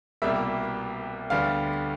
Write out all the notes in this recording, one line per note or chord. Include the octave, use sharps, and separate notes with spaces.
C2 B2 G3 A#3 E5
D2 D3 G3 B3 F5